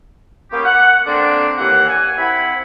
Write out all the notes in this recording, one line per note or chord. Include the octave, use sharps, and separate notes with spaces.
A#3 B3 C#4 G4
F#5
D3 A#3 C4 D4
D#2 E3 A#3 F#5
G#5
C4 E4 F#5 B5